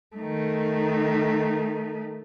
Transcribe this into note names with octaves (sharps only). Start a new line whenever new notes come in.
D#3 A3